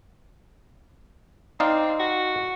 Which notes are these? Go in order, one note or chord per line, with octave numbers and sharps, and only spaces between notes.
C4 D#4 D5 F5
F#4